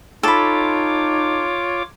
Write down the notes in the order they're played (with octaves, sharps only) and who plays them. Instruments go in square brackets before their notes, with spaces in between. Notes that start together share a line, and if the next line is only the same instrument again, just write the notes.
[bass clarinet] D#4 [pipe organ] F4 C#5 D6 [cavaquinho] A4 B5